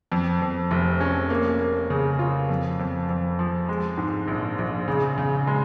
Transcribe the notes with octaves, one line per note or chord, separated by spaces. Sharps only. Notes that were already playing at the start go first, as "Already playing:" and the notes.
F2
F2
F1
C#4
A#3
A#3
C#3
F4
F2
F2
F2
F3
G#3
G#2
A#1
A#1
C#3
C#3
G#3